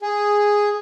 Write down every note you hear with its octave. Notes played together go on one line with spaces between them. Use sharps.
G#4